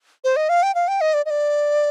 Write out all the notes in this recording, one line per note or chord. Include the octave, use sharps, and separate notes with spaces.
C5
D#5
F5
G5
F5
G5
D#5
D5
D#5
D5